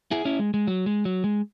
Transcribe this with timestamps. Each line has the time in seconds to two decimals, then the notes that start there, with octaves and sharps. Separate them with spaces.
0.11 E4 G#4
0.25 C#4 E4
0.39 G#3
0.54 G#3
0.67 F#3
0.86 G#3
1.05 F#3
1.24 G#3